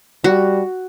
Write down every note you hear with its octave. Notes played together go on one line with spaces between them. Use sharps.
G3 F#4